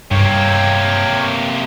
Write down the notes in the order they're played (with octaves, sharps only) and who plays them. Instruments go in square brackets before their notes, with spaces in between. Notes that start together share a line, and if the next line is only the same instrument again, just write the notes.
[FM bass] G2 [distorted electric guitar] C3 A#3 [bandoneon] C#5 G5